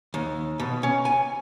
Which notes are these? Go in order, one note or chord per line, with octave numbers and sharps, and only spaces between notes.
D#2
B2
C#4
G#5